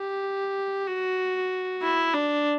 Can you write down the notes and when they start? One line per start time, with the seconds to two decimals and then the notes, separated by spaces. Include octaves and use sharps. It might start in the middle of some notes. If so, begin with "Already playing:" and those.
Already playing: G4
0.87 F#4
1.82 E4
2.14 D4